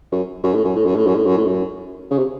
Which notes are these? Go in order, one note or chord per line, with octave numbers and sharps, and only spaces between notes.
F#2
F#2
A2
F#2
A2
F#2
A2
F#2
A2
F#2
A2
F#2
C#3
C3